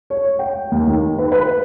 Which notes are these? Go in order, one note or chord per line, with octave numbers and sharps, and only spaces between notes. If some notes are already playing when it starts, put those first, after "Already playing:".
C#5
G5
D#2
D#3
B4
B4